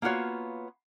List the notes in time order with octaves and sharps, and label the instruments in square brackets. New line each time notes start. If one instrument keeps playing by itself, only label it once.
[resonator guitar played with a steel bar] A#3 B3 F4 F#4 C#5